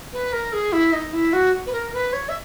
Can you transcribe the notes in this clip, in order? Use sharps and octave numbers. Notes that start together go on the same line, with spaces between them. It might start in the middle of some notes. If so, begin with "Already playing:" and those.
B4
A#4
G#4
E4
D#4
E4
F#4
B4
A#4
B4
C#5
E5